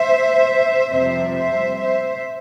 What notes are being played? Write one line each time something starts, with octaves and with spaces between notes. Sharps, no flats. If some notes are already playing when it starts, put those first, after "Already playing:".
Already playing: C5 E5
F2 C3 G3 C4 C5 E5
C5 E5
C5 E5